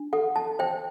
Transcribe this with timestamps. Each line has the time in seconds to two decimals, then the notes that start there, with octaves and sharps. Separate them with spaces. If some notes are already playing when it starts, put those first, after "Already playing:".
Already playing: D4
0.13 A4 F#5
0.36 A5
0.59 C5 G5